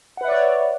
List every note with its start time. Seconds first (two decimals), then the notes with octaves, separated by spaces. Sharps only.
0.17 F#5
0.21 B4
0.24 E5
0.28 D5
0.32 C#5